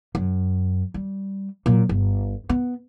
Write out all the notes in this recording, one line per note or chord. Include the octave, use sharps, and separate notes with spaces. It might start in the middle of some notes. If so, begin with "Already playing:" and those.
F#2
G3
A#2 F#3
G1
B3